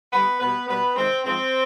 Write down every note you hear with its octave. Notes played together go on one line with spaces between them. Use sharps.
G2 D3 G3 B3 B4
B2 G3 B3 B4
B2 G3 B3 B4
C3 D#3 G#3 C4
G#2 F3 G#3 C4